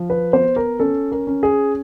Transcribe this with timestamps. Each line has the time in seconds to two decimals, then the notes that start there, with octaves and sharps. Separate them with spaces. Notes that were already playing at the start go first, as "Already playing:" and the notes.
Already playing: F3
0.10 B4
0.33 B3 C5
0.56 A#4
0.79 C#4 A4
1.12 A#4
1.27 C#4
1.43 G#4